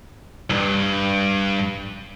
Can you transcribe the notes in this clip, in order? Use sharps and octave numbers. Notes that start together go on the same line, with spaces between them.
C2 G2